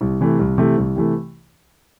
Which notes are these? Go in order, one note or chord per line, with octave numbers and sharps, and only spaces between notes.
C2
C3 E3 A3
C2
C3 E3 A3
C2
C3 E3 A3